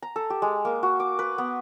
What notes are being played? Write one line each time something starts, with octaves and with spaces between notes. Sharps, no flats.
A#5
A4
G4
G#3
A#3
F#4
D6
B4
B3